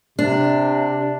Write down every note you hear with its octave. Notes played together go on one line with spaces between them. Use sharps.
C3 D4